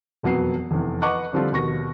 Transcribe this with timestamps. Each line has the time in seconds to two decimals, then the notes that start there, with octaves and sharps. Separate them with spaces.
0.23 E1 F2 F#3 B3 C7
0.71 F1 E2
1.02 B4 D#5 F#5 C#6 D6 F#6
1.33 D3 F3 G3 C4 F4 A4
1.52 D#2 B2 C#6 A#6